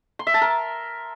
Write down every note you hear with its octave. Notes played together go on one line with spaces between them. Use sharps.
C6
E5
A5
A#4